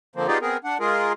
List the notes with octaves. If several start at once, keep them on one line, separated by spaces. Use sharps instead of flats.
D3 F3 A#3 C4
B3 D#4 F4 G4 G#4 D5
B3 C4 G#4 A#4
D4 F#5
G#3 F4 G#4 A#4